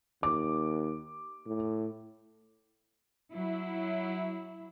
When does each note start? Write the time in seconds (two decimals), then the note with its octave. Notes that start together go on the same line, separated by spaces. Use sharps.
0.23 D#2 D6
1.46 A2
3.32 F#3 E4